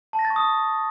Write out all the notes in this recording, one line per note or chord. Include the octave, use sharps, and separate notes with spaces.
A5
A#6
A6
C#6
D#6